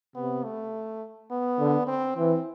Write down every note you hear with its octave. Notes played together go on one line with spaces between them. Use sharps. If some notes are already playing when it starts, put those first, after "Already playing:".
C3 B3
A3
B3
D3
C4
E3 C4